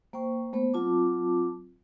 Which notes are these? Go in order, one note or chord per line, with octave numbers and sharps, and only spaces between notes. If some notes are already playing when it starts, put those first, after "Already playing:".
A#3 C5 G5 C#6
A3 B3 C5
F#3 C4 F4 A5 D6